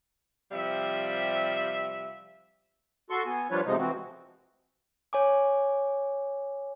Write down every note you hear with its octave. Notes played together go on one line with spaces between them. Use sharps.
C3 F3 G3 E5
F#4 A4 C6 C#6
B3 G#5
F3 G3 D4 F4 B4 C#5
A2 C3 F3 G#3 D#4
E3 F3 C4 F#4
C#5 G#5 D6